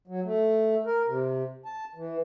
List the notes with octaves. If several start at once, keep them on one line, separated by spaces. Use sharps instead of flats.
F#3
A3
A#4
C3
A5
E3